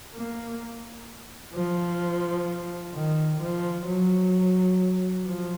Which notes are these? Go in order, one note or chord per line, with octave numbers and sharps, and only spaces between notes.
A#3
F3
D#3
F3
F#3
F3